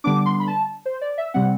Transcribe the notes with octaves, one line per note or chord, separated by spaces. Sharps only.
D3 G3 B3 D4 D6
C6
B5
A5
C5
D5
E5
C3 G3 C4 F#5